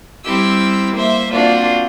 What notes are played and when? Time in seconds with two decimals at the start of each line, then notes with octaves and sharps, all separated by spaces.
0.23 G3 C4 E4 G4 E6
0.95 A#3 C5 E5
1.30 A#3 C4 D4 F4 F#4